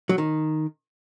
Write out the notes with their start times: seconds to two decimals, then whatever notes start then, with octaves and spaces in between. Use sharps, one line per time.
0.09 F#3
0.18 D#3